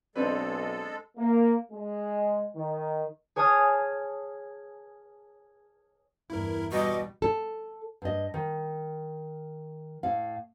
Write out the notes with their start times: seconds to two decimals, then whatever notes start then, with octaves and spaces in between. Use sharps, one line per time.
0.15 B1 G#3 C4 D4 A4 B4
1.17 A#3
1.72 G#3
2.55 D#3
3.36 G#4 C#5 G#5 A5 D#6 F6
6.30 E2 G2 E4 A#4
6.72 B2 G3 D#5 C#6 D6
7.22 A4
8.02 G2 D#5
8.34 D#3
10.03 A2 F5